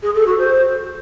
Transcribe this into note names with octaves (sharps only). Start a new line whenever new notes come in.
G#4
A4
F#4
C5